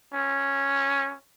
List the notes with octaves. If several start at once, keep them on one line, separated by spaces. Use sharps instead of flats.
C#4